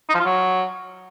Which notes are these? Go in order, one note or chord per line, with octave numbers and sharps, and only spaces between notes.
D#4
F3
F4
F#3